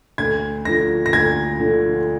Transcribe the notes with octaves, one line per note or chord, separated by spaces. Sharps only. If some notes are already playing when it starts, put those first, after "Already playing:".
D2 G#6
D3 F3 A#6
A#6
D2 G#6
D3 F3